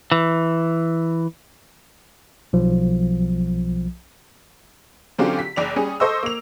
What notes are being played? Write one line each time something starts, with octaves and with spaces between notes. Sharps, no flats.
E3
B1 F3
D3 F#3 C4 C#4 F4 G4
B6
F#1 D5 F7
G3 C#4 G#4
A4 C5 D#5 C#6 E6
A#3 F7